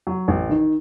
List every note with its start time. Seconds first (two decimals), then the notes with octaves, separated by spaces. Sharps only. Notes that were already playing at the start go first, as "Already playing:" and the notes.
0.07 F#3
0.28 A1
0.50 D#3